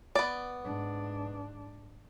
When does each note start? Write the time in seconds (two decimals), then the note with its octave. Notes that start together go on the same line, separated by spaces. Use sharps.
0.15 B3 D5
0.64 G#2 D4